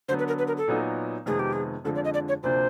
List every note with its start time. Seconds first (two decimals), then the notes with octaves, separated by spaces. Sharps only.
0.08 D3 F#3 B3 C5
0.19 B4
0.28 A#4
0.39 B4
0.48 A#4
0.57 A4
0.68 A#2 F#3 B3 D#4 F#4
1.26 F2 C3 D#3 G#3 B3 G#4
1.39 G4
1.53 G#4
1.85 F2 D3 F3 G#3 A4
1.95 D5
2.05 D#5
2.14 D5
2.29 C#5
2.43 D2 C3 F3 A#3 D4 C5